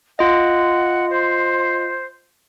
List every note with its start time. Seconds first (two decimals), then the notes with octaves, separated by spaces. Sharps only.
0.19 F4 D#5 F#5
1.10 C5